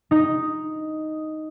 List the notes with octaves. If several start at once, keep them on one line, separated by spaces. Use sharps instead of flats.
D#4